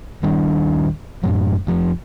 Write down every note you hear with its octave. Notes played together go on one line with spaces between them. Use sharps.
D#1 D#3 G3 D4
F#2 A2 F#3
F1 F3